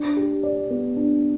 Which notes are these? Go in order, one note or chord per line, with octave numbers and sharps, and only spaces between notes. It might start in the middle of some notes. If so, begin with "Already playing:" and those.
Already playing: D4
G4
D5
B3
D4